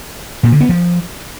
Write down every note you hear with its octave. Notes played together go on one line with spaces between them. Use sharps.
A#2
D3
B3
F3